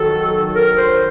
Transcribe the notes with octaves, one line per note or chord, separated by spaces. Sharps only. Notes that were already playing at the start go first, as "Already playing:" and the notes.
Already playing: D#3 F#3 A4
A#4
C5